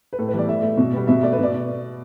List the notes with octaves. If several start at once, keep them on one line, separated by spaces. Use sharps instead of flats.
B4
A2 A4
B4
E3 G3 B3 D5
A2 E5
A3
B2
G3 B3
B2 E5
A3 D5
B4
B2 D5